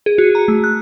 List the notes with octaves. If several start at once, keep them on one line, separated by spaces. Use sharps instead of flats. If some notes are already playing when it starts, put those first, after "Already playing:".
G#4
F#4
A#5
A3
F#6